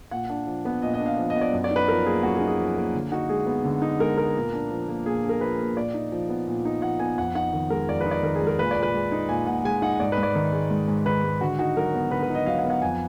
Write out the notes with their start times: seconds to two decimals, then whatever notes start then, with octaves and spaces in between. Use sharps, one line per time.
0.11 A#2 F#5
0.29 D4
0.47 F3
0.65 B3
0.82 A#2 D#5
0.94 D#5
0.99 D4
1.06 F5
1.18 F3
1.30 D#5
1.36 B3
1.41 D5
1.53 F#2
1.64 D5
1.71 D#4
1.76 B4
1.88 F3 A#4
2.06 A#3 G#4
2.23 F#2 F#4
2.35 G#4
2.41 D#4
2.47 G#4
2.58 F3
2.77 A#3
2.94 D3
3.12 D#4 F#4
3.29 G#3 G#4
3.47 B3
3.64 D3
3.82 D#4
4.00 G#3 A#4
4.17 B3 A#4
4.35 A#2
4.53 D4
4.71 F3
4.88 A#3
5.05 A#2 G#4
5.23 D4
5.29 A#4
5.41 F3 B4
5.59 A#3
5.77 A#2 D5
5.94 D#4
6.12 F3
6.29 B3
6.46 A#2
6.65 D#4
6.82 F3 F#5
6.99 B3 G#5
7.18 F2 F#5
7.35 D#4 F#5
7.53 D#3
7.70 G#3 A#4
7.89 F2 D5
8.01 B4
8.06 D#4
8.11 D5
8.23 D#3 A#4
8.35 G#4
8.42 G#3
8.47 A#4
8.59 A#2 B4
8.71 D5
8.76 A#2
8.83 B4
8.94 G#3
9.12 D#4
9.29 A#2 G#5
9.46 A#2 F#5
9.65 G#3 G#5
9.82 D#4 F#5
10.00 G#2 D5
10.12 B4
10.18 G#2
10.23 D5
10.35 D#3
10.52 G#3
10.71 G#2
10.88 G#2
11.06 D#3 B4
11.24 G#3
11.41 D3 F#4
11.59 D#4 F#4
11.76 F#3 A#4
11.94 B3
12.11 D3 B4
12.23 B4
12.30 D#4 D#5
12.46 F#3 F5
12.59 F#5
12.65 B3
12.70 F#5
12.82 F2 G#5